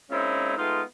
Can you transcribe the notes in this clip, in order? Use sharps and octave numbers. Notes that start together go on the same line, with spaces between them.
G#3 A#3 C4 C#4 D#4 E4
G#3 A3 B3 D#4 F4